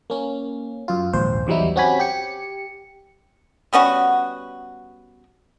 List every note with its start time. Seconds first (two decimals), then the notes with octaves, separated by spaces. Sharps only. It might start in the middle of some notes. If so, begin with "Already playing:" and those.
0.10 A#3 C#4
0.88 F#2 F4
1.13 A#1 D#2 G#2 C5
1.47 E2 E3 F#3 G3 D#4 E4
1.76 C4 C#4 F#4 G4 G#5 B5
2.00 G4 C#7
3.73 G3 B3 C#4 F#4